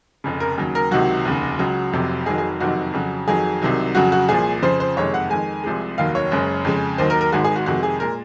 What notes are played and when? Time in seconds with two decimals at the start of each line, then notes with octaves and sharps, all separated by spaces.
0.24 F1 F2 C#3
0.40 A#4
0.58 D#2 C#3 F#3
0.75 A#4
0.91 C#2 C3 D#3 F#3 F#4
1.25 F1 D#2 C#3
1.59 C#2 C#3 F#3
1.93 F1 F2 C3 F#3
2.26 F1 F2 D#3 F#3 G#4
2.38 G#4
2.60 F#1 F2 C3 D#3 F#3 F#4
2.93 F2 C#3 F#3
3.28 F2 D#3 F#3 G#4
3.62 C2 C3 D#3 F#3
3.95 F2 C#3 F#3 F#4
4.12 F#4
4.28 C2 A#2 F3 G#4
4.62 F2 C#3 F3 C5
4.80 C5
4.97 F#1 F2 C3 D#3 G#3 C#5
5.14 F#5
5.30 F2 D#3 G#3 G#5
5.64 C2 C3 F3 G#3
5.98 F1 D#2 D#3 F#3 F5
6.15 C#5
6.31 F#1 F#2 C#3 G#3
6.65 F2 C#3 G#3
6.98 D#2 D#3 F#3 C5
7.10 A#4
7.21 A#4
7.32 G#1 G#2 D#3 G#3 F#4
7.44 G#4
7.56 F#4
7.66 F2 C3 D#3 G#3 F#4
7.83 G#4
8.00 A#2 G#3 A#4